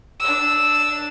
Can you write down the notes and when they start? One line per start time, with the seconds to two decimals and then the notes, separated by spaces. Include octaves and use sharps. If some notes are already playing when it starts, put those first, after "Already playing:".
0.20 D4 E6